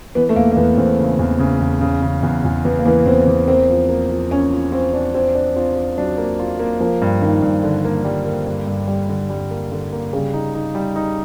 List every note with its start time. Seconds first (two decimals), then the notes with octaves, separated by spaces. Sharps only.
0.15 E3 B3
0.29 A3
0.36 E2 A#3
0.52 A#3
0.57 E2 B3
0.77 E2 C4
0.99 C#3
1.19 E2
1.39 C#3
1.60 E2
1.81 C#3
2.02 C#3
2.23 E2
2.45 E2
2.64 E2 B3
2.79 A#3
2.86 E3 B3
3.06 E2 C4
3.28 E2
3.48 A#3 C4
3.69 F3
3.89 A#3
4.10 F3
4.31 A#3 C#4
4.52 F4
4.72 C4 F4
4.94 D4
5.14 C4 F4
5.35 D4
5.56 C4 F4
5.76 F4
5.97 F#3 D4
6.18 A#3
6.39 F4
6.59 A#3
6.80 F3 A#3
7.02 G2
7.22 D#3 A#3
7.42 G2
7.63 D3
7.85 A#3
8.05 G3
8.25 A#3
8.47 G2
8.67 G2
8.88 G3
9.09 D3
9.30 G3
9.51 A#3
9.72 D3
9.92 A#3
10.13 C#3 G3
10.34 D#4
10.55 D#4
10.75 G3
10.96 D#4